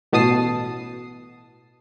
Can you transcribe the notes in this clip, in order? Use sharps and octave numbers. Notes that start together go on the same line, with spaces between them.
A1 B2 A5 D#6 C7